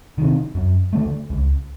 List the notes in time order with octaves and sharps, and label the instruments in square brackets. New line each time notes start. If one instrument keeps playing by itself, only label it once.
[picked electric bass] C3 D#3
F#2
D3 F3 A3
C#2